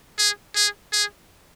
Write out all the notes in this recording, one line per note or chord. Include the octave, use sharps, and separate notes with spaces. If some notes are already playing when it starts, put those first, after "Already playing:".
G#4
G#4
G#4